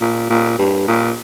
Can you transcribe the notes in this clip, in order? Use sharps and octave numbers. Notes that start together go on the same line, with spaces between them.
A#2
A#2
G2
A#2